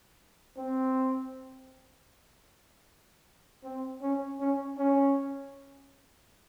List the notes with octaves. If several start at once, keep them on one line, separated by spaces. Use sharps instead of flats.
C4
C4
C#4
C#4
C#4